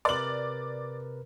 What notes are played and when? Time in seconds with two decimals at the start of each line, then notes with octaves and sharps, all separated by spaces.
0.05 C3 A#4 B4 D5 F#7